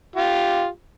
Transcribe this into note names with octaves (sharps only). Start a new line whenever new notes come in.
F4 G4